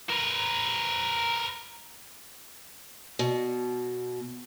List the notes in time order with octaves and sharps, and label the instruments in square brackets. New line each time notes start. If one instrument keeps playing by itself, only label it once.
[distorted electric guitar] A#4 B4
[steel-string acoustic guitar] B2